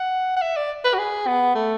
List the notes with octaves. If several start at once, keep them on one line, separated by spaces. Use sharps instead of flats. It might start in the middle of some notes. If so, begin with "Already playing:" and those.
Already playing: F#5
F#5
E5
D5
B4
F#4
G#4
B3
A3